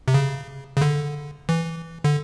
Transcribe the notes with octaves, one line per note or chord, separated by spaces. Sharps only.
C3
C#3
C#3
D3
E3
D3